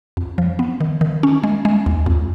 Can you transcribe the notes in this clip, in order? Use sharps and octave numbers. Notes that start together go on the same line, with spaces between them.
F2
F3
B3
D#3
D#3
C#4
G#3
G#3
D#2
F2